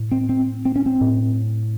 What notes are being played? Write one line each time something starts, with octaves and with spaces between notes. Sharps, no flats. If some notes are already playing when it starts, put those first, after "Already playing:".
Already playing: A2
C4
C4
C4
C#4
C4
A2